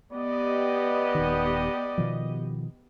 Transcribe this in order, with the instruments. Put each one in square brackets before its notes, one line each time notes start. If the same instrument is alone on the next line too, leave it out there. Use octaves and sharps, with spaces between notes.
[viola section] B3 G4 D#5 [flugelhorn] D5
[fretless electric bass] D#1 D#3
B2 D#3 F3